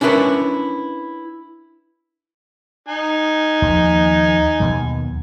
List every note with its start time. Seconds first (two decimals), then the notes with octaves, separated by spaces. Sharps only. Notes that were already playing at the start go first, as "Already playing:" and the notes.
0.01 C#4 D4 E4 A#4 B4 C#5
2.88 D#4 G#5
3.62 D#2 F3 A#3
4.60 D#2 B2 F#3